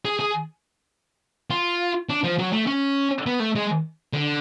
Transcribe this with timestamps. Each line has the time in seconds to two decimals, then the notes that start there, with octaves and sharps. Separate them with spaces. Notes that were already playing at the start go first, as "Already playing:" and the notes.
0.05 G#4
0.19 G#4
1.50 F4
2.09 D4
2.24 F3
2.39 F#3
2.53 A3
2.67 C#4
3.26 B3
3.40 A3
3.55 G#3
4.13 D3